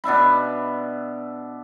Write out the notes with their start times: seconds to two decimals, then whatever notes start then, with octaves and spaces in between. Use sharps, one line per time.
0.04 B2 D4 E5 B5